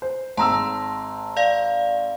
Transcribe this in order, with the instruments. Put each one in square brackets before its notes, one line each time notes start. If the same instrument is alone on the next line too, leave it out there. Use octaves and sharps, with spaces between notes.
[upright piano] C5
[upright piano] G#1 A#5 E6 [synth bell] F#5 A5 C6
[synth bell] D5 F5